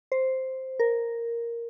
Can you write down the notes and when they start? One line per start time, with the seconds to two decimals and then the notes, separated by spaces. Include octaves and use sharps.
0.12 C5
0.80 A#4